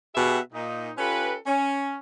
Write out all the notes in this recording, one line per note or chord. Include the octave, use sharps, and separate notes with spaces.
B2 G4 G#4 E5 F#5 G5
A#2 D#4
C#4 F4 G4 A4 B4
C#4